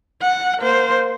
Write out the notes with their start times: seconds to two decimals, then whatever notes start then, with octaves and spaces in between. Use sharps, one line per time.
0.22 F#5
0.59 A#3 C5